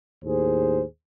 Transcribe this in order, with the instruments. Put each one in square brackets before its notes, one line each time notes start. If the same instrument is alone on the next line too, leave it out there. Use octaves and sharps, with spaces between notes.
[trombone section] D#2 A2 G#4 C5